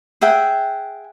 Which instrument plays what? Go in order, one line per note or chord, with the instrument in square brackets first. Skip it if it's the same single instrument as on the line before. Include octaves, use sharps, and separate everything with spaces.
[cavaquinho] G#4 E5 F#5 G5